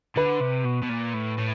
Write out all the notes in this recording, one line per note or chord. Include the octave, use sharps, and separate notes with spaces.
D3 B4
C3
B2
B2
A#2
A2
A2